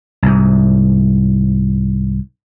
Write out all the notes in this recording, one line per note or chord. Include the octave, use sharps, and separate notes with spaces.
C2 G#2